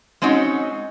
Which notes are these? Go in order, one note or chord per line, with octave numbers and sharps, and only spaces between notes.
G#3 C4 C#4 D#4 F#4